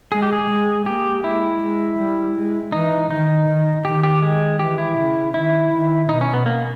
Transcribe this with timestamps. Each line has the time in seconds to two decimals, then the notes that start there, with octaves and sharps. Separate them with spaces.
0.12 G#3 G#4
0.22 G4
0.33 G#4
0.49 G#3
0.86 A#3 G4
1.24 G#3 E4
1.61 G#3
1.98 G3
2.36 G#3
2.72 E3 D#4
3.10 D#3 D#4
3.47 D#3
3.85 D#3 G4
4.03 G4
4.22 G#3
4.59 E3 G4
4.78 E4
4.97 C#3
5.34 D#3 E4
5.72 D#3
6.09 B2 D#4
6.21 C#4
6.34 B3
6.46 A#3